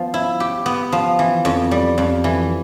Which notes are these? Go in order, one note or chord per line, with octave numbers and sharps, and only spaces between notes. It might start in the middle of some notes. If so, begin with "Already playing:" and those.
Already playing: F3 B3
E4
G4
B3
F3
E3
F2
G3
F2
E3